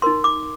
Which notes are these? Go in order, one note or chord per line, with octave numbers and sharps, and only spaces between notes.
D#4 A#4 C6
D6